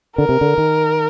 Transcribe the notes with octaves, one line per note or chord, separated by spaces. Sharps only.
D3 A#4
C3
D3
D#3